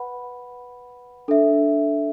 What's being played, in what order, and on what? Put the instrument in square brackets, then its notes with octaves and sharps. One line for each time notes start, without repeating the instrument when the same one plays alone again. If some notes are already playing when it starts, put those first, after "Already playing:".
Already playing: [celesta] B4 F#5 B5
D4 A4 E5